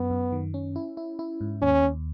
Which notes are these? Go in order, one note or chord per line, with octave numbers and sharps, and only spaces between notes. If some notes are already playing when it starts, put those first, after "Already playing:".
Already playing: F#2 B3
F#2
D#3
C#4
E4
E4
E4
G#2
D#2 C#4
D#2